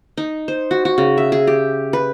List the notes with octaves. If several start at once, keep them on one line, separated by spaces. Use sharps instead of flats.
D#4
C5
F#4
F#4
C#3
E5
G#4
G4
B4